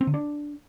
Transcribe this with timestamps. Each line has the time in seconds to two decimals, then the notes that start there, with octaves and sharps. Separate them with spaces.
0.01 C4
0.07 D3
0.14 D4